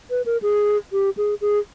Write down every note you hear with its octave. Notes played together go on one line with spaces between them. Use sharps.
B4
A#4
G#4
G4
G#4
G#4